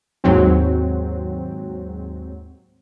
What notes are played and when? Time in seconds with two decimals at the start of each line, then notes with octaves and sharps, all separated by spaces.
0.24 D#2 G#2 F#3 C4